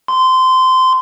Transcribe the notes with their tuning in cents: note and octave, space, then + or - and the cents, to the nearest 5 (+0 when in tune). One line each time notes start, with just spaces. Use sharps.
C6 -20